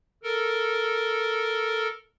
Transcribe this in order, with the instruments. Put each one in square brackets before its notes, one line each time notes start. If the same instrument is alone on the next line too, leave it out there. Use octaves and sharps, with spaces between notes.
[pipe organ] A4 A#4